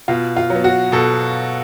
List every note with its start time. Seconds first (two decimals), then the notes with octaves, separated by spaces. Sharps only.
0.08 B2 F4
0.37 F4
0.50 F#3 B3
0.64 F#4
0.92 B2 A4